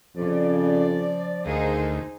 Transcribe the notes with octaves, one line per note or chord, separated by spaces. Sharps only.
F2 C#3 F3 D5
D2 D#3 D#4 G#4 A#4 C5 F5